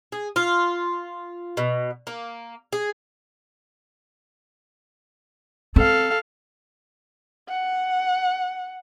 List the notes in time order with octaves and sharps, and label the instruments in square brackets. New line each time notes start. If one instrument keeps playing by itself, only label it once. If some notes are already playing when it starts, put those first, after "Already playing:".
[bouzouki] G#4
F4
B2
A#3
G#4
[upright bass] C4 [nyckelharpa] A4 F5
[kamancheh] F#5